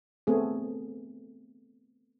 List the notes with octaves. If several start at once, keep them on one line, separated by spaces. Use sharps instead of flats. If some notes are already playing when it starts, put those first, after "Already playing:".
A3 B3 C4 G#4